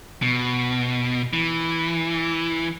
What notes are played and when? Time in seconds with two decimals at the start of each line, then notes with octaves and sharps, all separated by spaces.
0.22 B2
1.33 E3